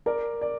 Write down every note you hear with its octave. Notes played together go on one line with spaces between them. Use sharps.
A#4 D5
D5